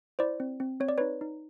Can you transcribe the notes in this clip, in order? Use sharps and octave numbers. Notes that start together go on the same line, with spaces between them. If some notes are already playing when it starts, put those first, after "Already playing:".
E4 C5 D5
C4
C4
C4 C#5
D5
D#4 B4 C#5
D#4